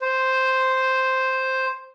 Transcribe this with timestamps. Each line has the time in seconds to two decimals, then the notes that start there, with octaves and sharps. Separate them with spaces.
0.02 C5